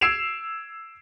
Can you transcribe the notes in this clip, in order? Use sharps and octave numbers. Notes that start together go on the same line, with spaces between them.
E6 G#6 C7 D7 E7 F7